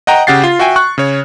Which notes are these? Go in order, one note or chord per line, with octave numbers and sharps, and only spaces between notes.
D#5 F#5 G5 A#5
C#3 G4 F#5 A6 C7
F4
F#4 E5 G5 G#5
C#6 F#6
C#3 C#5